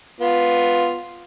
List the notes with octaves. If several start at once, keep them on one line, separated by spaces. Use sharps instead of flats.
B3 F4